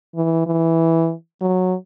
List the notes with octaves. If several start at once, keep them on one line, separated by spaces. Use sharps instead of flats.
E3
E3
F#3